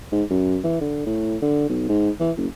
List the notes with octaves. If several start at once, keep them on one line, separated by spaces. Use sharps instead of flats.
G#2
F#2
E3
D3
A2
D3
B1
G#2
E3
F#1